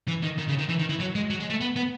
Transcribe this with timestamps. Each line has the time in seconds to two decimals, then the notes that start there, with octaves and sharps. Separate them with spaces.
0.08 E3
0.23 D#3
0.39 D#3
0.49 C#3
0.59 D#3
0.69 E3
0.79 D#3
0.89 E3
1.00 F#3
1.15 G#3
1.30 F#3
1.40 G#3
1.50 A3
1.61 B3
1.76 B3